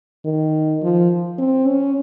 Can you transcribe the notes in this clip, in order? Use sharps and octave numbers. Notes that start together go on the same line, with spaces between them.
D#3
F3
C4
C#4